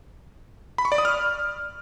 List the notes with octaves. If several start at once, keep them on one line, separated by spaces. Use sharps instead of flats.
B5
C#6
D5
D#6
F6